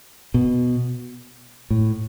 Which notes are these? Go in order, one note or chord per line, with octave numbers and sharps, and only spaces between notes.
B2
A2